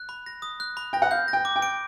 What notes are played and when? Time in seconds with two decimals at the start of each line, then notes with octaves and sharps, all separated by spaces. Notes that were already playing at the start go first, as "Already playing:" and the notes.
Already playing: F#6
0.09 B5
0.26 A#6
0.42 D#6
0.60 F#6
0.77 B5
0.93 G5 A#6
1.02 F#5
1.11 F5 G6
1.28 A#6
1.33 G5
1.45 D6
1.56 G5
1.62 D7